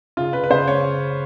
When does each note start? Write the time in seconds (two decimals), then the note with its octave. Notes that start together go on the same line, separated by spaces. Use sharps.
0.17 C#3 F4
0.33 C#3 B4
0.44 B4
0.50 C#3 C5
0.68 C#3 C#5